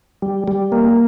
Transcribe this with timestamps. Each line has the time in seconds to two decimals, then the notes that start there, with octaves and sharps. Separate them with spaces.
0.22 G3
0.48 G3
0.72 A#3